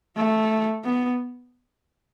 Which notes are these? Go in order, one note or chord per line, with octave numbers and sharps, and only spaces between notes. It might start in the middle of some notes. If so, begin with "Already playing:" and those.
A3
B3